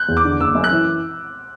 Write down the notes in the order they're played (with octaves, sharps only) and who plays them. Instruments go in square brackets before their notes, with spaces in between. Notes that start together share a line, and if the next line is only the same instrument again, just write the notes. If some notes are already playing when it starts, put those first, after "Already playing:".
Already playing: [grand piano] F#6 G6
[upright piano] E2
[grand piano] D6
[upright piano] D3
[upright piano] F#1 [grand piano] E6
[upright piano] F#2
[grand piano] F#6
[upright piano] E3